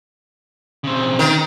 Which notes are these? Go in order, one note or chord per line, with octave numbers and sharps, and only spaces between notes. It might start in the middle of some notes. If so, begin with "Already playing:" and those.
C#3 C4
D#3